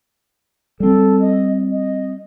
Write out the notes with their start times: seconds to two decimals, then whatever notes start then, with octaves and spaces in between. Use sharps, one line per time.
0.80 G3 C4 A4
1.20 D#5
1.72 D#5